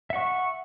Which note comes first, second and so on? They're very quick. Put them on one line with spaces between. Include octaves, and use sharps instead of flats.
E5 F#5 C#6